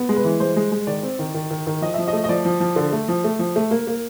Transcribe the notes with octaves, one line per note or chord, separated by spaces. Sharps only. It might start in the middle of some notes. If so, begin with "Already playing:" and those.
Already playing: B3
G#3
B4
E3
G#3 C5
G#3
G#3
D#3 D5
C4
D#3
D#3
D#3
D#3
F3 D#5
F3 E5
D#5
A3
D#5
F3 D5
F3
F3
D3
A3
F3
A3
F3
A3
A#3
A#3